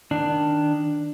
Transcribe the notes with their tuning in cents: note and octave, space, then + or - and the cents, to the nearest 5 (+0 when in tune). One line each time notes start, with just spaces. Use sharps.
D#3 +0 D4 +10